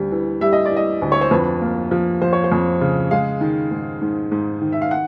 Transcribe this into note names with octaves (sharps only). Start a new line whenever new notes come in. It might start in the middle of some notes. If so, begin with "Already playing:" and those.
Already playing: D2 G3
E3
G3 E5
D#5
D5
E3
D#5
D2
C#5
C5
F2 B4
A#3
F3
F3 C5
C#5
C5
F2
C#3
G#3 F5
D#3
G#2
G#2
G#2
D#3
E5
F5
F#5